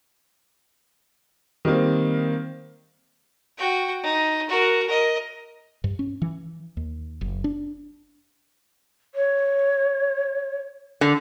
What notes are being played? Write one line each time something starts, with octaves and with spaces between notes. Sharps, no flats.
D#3 G3 A#3 C4
F#4 G5
D#4
F#4 A#4
A#4 D#5
G2
C#4
E3
D#2
F#1
D4
C#5
D3